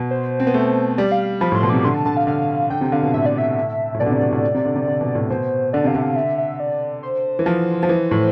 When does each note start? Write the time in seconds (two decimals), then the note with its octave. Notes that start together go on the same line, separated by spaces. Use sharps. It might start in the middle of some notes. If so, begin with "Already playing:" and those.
Already playing: B2
0.11 C5
0.40 C4
0.47 B3
0.54 A3
0.98 G3 D5
1.12 F5
1.41 F3 B5
1.52 A2 C6
1.63 B2
1.70 C3 D6
1.84 D3 C6
1.95 A5
2.06 D3 A5
2.17 F5
2.27 D3 F5
2.70 D3 G5
2.81 C3
2.92 D3 F5
3.03 B2
3.14 A2 E5
3.26 D5
3.38 E5
3.94 A2
4.00 B2 D5
4.06 D3
4.11 C3
4.22 B2
4.32 A2
4.55 C3
4.65 D3
4.76 C3
4.87 D3
5.01 B2
5.15 A2
5.30 B2 C5
5.73 D3 D5
5.84 C3 F5
5.95 D3 E5
6.02 F5
6.16 E5
6.38 E5
6.60 D5
7.03 C5
7.39 E3
7.46 F3
7.83 F3
7.89 E3
8.11 A2